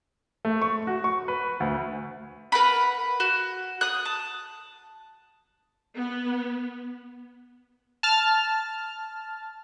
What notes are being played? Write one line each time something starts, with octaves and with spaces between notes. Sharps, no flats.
A3
C#6
F#4
C#6
B4
D2
A#4 B4 F#5 B5
F#4
D#6 F#6
A5
B3
A5 F6